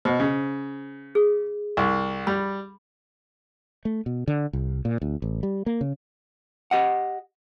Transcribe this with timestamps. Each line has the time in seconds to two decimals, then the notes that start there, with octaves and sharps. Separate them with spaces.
0.05 B2 C5
0.20 C#3
1.15 G#4
1.77 C2
2.27 G3 B5
3.85 A3
4.06 B2
4.28 D3
4.53 C2
4.85 A#2
5.02 D2
5.22 A1
5.43 G3
5.66 A#3
5.81 C#3
6.71 G4 D#5 F#5